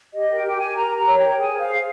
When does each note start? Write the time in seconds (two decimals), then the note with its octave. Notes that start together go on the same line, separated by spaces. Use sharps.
0.13 G4 D#5
0.30 A#4 G5
0.45 G4
0.56 G4 G#5
0.76 A#4 A#5
0.91 G4
0.97 A#5
1.07 C#5
1.17 G5
1.23 A#4
1.38 G#4 G#5
1.54 C5 F5
1.69 G#4